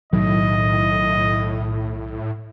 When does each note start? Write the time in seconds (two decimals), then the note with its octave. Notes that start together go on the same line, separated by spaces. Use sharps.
0.13 B1 A2 D#3 F#3 D#5